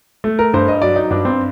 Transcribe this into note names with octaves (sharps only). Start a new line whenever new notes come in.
A3
A#4
G2 C5
D#5
F#3 D5
D#4
G2 D4
C4